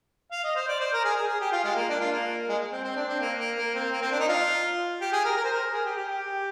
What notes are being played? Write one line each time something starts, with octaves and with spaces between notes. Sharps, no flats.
F5
D#5
C5
D5
C5
A#4
G#4
G#4
G#4
G4
F4
G#3
A#3
D4
F4
A#3
G#3
C4
C4
D4
C4
A#3
A#3
A#3
C4
A#3
C4
D4
D#4
F4
G4
G#4
A#4
A#4
C5
A#4
G#4
G4
G4
G4